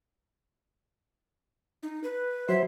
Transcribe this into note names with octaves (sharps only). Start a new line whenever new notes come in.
D#4
B4
F#3 C5 E5